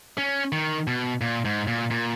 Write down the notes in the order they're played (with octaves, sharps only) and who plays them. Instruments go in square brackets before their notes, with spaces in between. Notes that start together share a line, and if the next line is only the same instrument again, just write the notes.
[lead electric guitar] C#4
D#3
B2
A#2
G#2
A#2
A#2